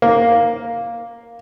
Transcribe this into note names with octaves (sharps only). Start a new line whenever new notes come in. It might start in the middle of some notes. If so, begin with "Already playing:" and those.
A#3